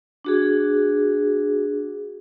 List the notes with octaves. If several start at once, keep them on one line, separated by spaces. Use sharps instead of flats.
D4 F#4 G#4